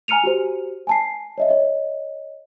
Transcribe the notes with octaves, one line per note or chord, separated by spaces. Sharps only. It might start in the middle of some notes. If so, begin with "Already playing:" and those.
G#5 A#5 F6 C#7 D#7 F7
F#4 G4 C5
G#5 A5 C7
C#5 D#5 E5
C#5 D#5